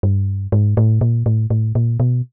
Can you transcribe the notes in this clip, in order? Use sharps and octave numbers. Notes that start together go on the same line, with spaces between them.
G2
G#2
A2
A#2
A2
A2
A#2
B2